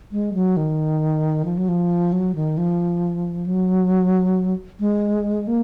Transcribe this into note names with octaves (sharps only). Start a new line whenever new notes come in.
G#3
F#3
D#3
F3
F#3
F3
F#3
D#3
F3
F#3
G#3
A#3